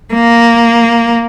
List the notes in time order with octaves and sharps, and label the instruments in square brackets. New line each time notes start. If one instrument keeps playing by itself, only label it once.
[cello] A#3